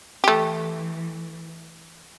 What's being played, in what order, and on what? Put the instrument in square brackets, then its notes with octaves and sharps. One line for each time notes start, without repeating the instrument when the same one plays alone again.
[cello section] E3 [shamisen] A3 G4